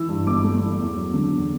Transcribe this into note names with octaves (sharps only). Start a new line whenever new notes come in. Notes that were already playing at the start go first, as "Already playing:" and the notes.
Already playing: E3 E6
G2
G1 D6
A3
E3
E2
F#3
D3
E2